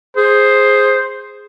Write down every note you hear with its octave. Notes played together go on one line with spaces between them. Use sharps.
G#4 C5